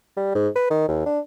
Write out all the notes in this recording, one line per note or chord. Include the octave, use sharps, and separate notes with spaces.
G3
G#2
B4
D#3
D#2
D4